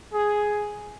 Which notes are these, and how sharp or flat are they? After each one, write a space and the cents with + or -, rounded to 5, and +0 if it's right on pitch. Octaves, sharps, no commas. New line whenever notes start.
G#4 +5